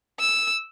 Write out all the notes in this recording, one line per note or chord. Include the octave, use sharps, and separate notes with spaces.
E6